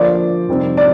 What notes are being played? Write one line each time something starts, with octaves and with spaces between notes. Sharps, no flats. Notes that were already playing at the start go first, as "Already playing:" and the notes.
Already playing: D3 F3 A#3 F4 C5 D5
F2 C3 G3 C4 D#4
D5